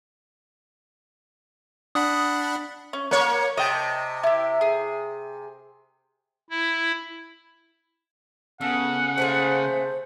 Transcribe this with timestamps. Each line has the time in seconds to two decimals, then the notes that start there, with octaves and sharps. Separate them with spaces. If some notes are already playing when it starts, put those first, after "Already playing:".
1.95 D4 F#5 B5 D#6
2.93 C#4
3.11 A#3 C#5 F#5
3.57 C3 D#5 G5 A5
4.24 E4 G4
4.61 G#4
6.50 E4
8.61 C#3 B3 A4 F#5
9.18 A3 A#3 G#4 C5